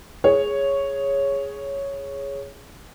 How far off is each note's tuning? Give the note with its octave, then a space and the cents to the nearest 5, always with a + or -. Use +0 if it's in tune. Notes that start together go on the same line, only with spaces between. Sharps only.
G#4 +0 C#5 +0